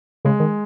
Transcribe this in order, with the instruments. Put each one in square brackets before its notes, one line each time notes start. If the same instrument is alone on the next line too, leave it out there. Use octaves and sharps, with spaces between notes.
[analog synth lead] C#3 [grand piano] G#3
[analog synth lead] D#3